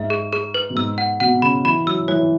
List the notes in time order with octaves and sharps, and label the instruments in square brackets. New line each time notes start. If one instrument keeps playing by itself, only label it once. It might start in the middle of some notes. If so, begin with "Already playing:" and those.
Already playing: [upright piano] G#2 [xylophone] E5
[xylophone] G#4
G#4
B4
[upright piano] B2
[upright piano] G#2 [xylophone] E6
[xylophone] F#5
[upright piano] B2 [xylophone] F#5
[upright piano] C#3 [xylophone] B5
[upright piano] E3 [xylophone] B5
[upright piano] F#3 [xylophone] E6
[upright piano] E3 [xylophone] C#5